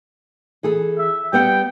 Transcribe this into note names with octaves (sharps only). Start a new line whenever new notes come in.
E3 G#4 A4
E5
G3 B3 F#5 G5